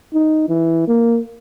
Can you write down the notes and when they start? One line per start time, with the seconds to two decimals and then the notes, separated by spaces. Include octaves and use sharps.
0.14 D#4
0.48 E3
0.88 A#3